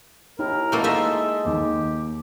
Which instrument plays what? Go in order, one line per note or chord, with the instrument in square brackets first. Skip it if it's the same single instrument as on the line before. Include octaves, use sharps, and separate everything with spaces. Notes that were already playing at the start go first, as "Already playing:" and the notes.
[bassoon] D#2 [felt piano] E4 [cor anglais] A#4
[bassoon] B2 [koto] A3 A#3 A4
[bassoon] G#3 [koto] D#4 F4 E5 [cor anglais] A4
[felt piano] D#2 [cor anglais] G4